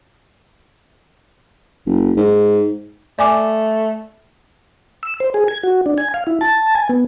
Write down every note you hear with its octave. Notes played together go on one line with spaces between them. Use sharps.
F#1
G#2
A3 D5 G#5 D6
E6
C5
G#4
G#6
F#4
D4
G#5
F5
E4
A5
G#5
B3